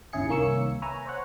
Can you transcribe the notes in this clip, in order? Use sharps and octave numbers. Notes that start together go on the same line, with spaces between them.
G1 D#2 C#3 E4 G#4 C#7
C2 D#3 A#3 C#5 E6 C#7
B4 C#5 E5 G#5 A#5
C5 C#5 F#5